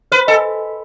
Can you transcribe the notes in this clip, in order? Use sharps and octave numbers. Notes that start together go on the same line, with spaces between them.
B4 C5
A4 D#5 G#5